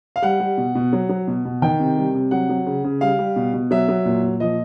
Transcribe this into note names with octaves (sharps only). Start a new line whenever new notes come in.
F5
G3 F#5
G3
B2
B2
F#3
F#3
B2
B2
D#3 G5
C3
G3
C3
F#3 F#5
F#3
C#3
C#3
G3 F5
G3
B2
B2
F#3 E5
F#3
A#2
A#2
F3 D#5